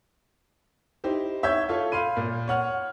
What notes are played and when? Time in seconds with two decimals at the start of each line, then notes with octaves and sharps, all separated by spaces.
1.04 D#4 E4 G4 C5
1.43 C#5 E5 E6 G6 G#6
1.69 F4 A4 C#5
1.92 F5 B5 C6 D#7
2.17 A#2
2.48 C#5 F#5 F6